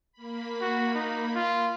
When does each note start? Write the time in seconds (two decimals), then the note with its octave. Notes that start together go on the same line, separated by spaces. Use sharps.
0.13 A#3 B5
0.61 F#4
0.95 D#4
1.35 F4